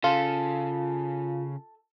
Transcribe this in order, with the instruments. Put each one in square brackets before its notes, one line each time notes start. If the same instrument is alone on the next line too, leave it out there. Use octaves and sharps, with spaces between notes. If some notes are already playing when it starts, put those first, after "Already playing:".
[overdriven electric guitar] C#3 [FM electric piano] F4 [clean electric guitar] A4